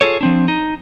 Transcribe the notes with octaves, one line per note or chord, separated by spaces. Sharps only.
F4 G#4 A4 C#5
F3 C4 D4
D#4